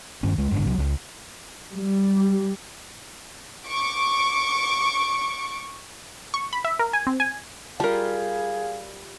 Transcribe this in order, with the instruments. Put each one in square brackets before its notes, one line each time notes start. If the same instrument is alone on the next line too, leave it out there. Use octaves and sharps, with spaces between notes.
[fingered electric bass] G2 D#3 C#4
C#2 G#3
F#1 G#2 D3
C2 F#3
C#2
[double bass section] G3
[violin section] C#6 D6
[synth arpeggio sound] C#6
B5
E5
A#4
G#5
C4
G#5
[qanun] G3 F4 [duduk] G#4 [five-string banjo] A#4 A5 [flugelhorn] F5